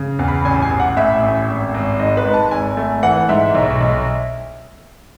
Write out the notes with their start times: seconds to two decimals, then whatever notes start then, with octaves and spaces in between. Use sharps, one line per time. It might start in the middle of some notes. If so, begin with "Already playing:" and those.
Already playing: C#3
0.19 E2
0.28 B5
0.45 A1 G#5
0.62 G#5
0.70 A1
0.80 F#5
0.97 A2 E5
1.22 A1
1.48 G#1
1.74 G#1
2.00 G#2 D#5
2.17 B4
2.25 G#2
2.34 A5
2.51 G#1 G#5
2.77 A3
3.03 E3 F#5
3.29 G#2 E5
3.55 B1
3.80 B1